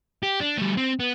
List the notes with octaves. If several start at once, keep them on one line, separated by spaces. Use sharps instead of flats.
G4
D4
G3 A3
C4
B3